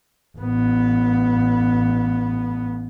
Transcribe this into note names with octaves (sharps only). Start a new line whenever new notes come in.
A1 B3